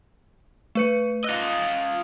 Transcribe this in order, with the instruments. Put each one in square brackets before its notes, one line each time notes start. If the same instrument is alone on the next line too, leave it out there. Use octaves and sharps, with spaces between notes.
[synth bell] A3 B4 C#7
[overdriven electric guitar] F4 D#5 [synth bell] E6 F#6 A#6